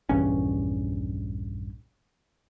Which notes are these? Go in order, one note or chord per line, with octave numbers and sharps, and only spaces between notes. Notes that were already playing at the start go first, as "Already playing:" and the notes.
A#1 E2 G2 C#4